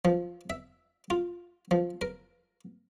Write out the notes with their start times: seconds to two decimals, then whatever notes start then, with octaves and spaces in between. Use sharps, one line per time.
0.05 F3
0.50 E5
1.10 F4
1.71 F3
2.01 A#4